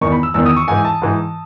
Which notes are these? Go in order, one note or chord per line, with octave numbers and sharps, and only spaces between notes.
E2 D#3 C#6
B5
E6
E2 D#3 E6
D#6
C#6
G#2 E3 G#5
A5
G#2 E3